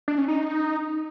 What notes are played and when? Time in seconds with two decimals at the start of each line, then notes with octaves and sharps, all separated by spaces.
0.08 D4
0.18 C#4
0.28 D#4